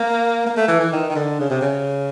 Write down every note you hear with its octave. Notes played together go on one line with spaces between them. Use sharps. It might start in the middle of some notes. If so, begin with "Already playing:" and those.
Already playing: A#3
A#3
A3
E3
E3
D#3
D#3
D3
C#3
C3
C#3